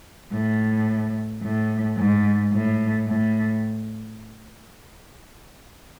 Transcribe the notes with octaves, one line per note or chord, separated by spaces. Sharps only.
A2
A2
G#2
A2
A2